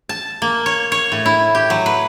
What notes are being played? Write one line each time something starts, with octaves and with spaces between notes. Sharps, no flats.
A5
A#3
C#5
C#5
A2
E4
G4
F#3
B4